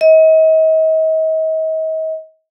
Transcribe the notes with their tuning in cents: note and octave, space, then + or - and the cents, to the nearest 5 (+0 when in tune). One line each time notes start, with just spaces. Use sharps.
D#5 +40